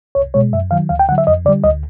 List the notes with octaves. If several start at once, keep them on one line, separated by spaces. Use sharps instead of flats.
C2 C#5
B2 G#3 C#5
F#2 E5
D#3 F#3 F5
D2 F5
G5
D3 F#3 F#5
E5
F2 D#5
D3 G3 D5
D2 D#5